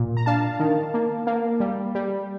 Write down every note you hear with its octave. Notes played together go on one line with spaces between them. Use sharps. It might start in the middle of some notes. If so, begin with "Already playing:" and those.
Already playing: A#2
A#5
D4 F5 A5
D#3
A#3
A#3
G3
G3